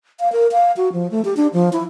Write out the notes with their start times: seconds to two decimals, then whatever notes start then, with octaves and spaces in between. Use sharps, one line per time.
0.20 F5
0.32 A#4
0.52 F5
0.77 F#4
0.93 F3
1.11 A3
1.25 G4
1.37 D4
1.53 F3
1.73 E4